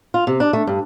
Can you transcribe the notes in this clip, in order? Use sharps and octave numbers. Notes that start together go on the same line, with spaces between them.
F4
C3
D4
A3
G2